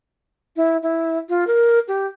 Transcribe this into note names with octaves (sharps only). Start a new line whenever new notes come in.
E4
E4
F4
A#4
G4